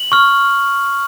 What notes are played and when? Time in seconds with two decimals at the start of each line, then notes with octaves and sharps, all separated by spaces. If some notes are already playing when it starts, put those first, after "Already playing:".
Already playing: F#7
0.12 C#6 F6